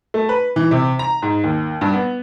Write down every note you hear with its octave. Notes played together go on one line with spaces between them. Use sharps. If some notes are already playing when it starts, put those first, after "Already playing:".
A3
B4
E3
C3
A#5
G#2
D#2
G2
B3